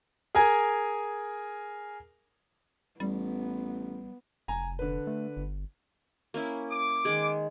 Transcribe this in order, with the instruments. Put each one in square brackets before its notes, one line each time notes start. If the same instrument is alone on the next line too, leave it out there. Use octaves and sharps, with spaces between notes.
[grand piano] G#4 A#4 G#5
[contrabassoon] A1 [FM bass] G3 [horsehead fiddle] B3
[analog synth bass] F1 [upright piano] G#5 A#5
[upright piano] D3 B4
[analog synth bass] A3
G1
[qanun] A#3 C#4 E4
[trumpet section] D6
[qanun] D#3 G#3 G#4